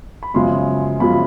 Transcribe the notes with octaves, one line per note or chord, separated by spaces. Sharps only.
B5
F#2 C#3 F3 G#3 C6
F#2 C#3 F3 G#3 B5